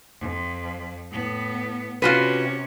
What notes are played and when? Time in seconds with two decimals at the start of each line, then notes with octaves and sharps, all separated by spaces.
0.20 F2
1.11 A2 B3
2.02 C3 C#4 F4 F#4 B4